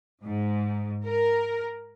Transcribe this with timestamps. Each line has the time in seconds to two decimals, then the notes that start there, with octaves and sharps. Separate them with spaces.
0.25 G#2
1.06 A#4